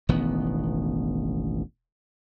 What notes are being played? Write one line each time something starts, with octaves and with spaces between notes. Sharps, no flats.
E1 A1 D#3 B3